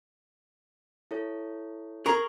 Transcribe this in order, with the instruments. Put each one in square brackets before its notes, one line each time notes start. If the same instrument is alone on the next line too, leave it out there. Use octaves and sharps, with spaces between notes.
[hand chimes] E4 A4 C#5
[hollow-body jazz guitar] G#4 A#4 A#5 [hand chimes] C#6